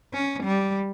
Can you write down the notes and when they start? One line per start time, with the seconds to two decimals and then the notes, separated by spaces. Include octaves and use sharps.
0.14 C#4
0.44 G3